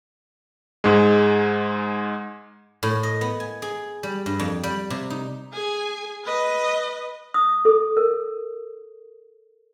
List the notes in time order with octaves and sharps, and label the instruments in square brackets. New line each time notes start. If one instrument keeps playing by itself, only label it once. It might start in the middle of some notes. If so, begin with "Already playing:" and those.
[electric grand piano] G#2 G#3
[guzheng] A2
D#5
B3
G#5
G#4
G3
G2
F2
G3
C3
D#4
[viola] G#4 G#5
B4 D#5
[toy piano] D#6
A4
A#4